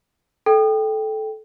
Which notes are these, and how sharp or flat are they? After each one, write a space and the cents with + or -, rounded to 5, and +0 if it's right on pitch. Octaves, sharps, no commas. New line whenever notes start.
A4 -20 G5 +0